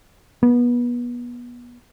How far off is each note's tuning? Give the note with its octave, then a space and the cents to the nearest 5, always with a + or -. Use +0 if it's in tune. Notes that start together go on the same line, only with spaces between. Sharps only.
B3 -30